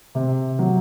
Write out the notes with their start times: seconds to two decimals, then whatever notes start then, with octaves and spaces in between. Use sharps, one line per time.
0.15 C3
0.59 F#3